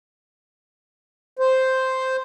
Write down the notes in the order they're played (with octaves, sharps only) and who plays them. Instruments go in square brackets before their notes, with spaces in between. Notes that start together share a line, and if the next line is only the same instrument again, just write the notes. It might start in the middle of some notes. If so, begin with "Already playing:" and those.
[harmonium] C5